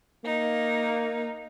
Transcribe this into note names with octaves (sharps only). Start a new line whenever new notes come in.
A#3 D#4